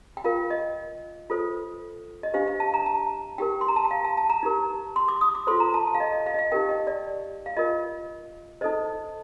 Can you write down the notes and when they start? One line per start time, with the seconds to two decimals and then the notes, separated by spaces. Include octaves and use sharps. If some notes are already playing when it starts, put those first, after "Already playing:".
0.17 G5
0.24 F4 A#4 F5
0.50 D#5
1.30 F4 A4 C5
2.23 D#5
2.34 D4 G4 C5 F5
2.48 F5
2.60 A5
2.74 A#5
2.86 A5
3.38 D#4 G4 A#4 G5
3.61 C6
3.68 A#5
3.76 A5
3.84 G5
3.91 F5
4.04 A5
4.17 A5
4.30 A#5
4.43 D#4 G4 A#4
4.96 C6
5.08 D6
5.21 D#6
5.35 D6
5.47 F4 A4 C5 C6
5.60 A#5
5.74 A5
5.87 A5
5.94 F5
6.00 D#5
6.12 D#5
6.26 F5
6.34 D#5
6.39 F5
6.52 D#4 G4 A#4 G5
6.69 D#5
6.87 D5
7.46 F5
7.57 F4 A#4 D#5
8.61 D#4 A4 C5 D#5